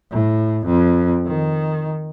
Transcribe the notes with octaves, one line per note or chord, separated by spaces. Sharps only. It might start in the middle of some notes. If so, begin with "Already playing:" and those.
A2
F2
D#3